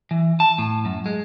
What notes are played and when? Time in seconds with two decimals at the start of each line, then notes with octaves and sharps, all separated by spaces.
0.11 E3
0.40 A5
0.58 A2
0.85 F#2
1.06 G#3